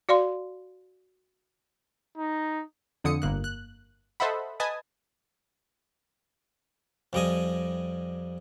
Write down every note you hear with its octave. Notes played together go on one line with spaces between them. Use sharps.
F#4 D5 F5 C6
D#4
F2 D3 D#6 C#7
G1 A#3 F#6
F#6
A4 C5 D#5 E5 F#5 B5
B4 D#5 G#5 A5 D#6
F2 G3 D#5 G#5